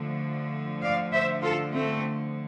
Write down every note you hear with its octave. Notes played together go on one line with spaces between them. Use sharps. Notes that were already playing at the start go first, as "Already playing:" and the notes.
Already playing: D3 F3 A3
D5 F5
C5 E5
F4 A4
A3 C4